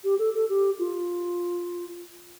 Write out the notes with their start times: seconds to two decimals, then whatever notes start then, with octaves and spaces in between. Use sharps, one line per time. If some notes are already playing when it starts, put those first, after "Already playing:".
0.04 G4
0.18 A4
0.34 A4
0.49 G4
0.79 F4